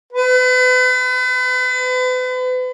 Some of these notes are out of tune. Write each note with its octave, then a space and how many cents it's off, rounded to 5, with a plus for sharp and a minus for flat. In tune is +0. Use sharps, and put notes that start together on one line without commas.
B4 +40